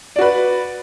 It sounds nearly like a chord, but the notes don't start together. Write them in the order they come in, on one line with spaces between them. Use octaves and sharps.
D5 F#4 B4